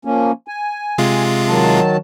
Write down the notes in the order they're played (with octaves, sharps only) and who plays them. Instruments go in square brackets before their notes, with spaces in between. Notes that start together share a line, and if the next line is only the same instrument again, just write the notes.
[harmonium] F3 A#3 C#4
G#5
[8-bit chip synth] C3 G#3 F4
[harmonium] D#3 F#3 A5